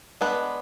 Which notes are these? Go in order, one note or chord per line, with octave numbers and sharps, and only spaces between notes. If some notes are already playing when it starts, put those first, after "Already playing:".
G#3 B3 D4 B4